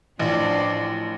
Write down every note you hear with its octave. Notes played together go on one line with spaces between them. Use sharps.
A1 F3 D4 D5